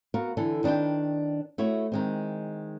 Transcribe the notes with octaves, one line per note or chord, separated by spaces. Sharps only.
B3 F#4 A#4 F5
D3 E3 A4
D#3 D4 B4 D5 G5
A3 E4 F#4 C#5
D#3 G#3 C4